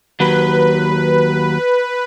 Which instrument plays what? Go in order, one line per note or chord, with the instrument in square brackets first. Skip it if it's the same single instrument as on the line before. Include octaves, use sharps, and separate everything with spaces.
[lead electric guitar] D#2 F#3 [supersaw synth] B4